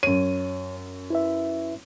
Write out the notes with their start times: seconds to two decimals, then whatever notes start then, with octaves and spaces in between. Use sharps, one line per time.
0.03 F#2 C#5 D#7
1.10 E4 B4 E5